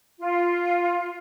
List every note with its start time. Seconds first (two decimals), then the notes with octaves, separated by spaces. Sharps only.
0.19 F4